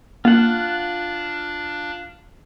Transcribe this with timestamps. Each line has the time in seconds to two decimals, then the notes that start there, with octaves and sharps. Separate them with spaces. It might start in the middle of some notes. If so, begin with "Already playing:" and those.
0.25 A#3 D4 F4 F#5